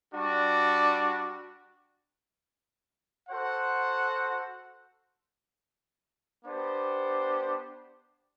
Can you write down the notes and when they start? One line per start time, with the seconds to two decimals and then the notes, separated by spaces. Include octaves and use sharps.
0.13 G3 D4 F#4
3.29 F#4 A4 C5 F#5
6.44 B3 D4 G4 C5